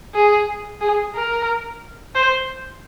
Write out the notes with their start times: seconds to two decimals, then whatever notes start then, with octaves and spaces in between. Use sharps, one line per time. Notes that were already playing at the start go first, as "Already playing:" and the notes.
0.15 G#4
0.81 G#4
1.15 A#4
2.15 C5